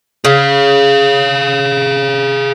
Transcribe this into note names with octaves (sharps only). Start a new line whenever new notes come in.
C#3 G#4 F5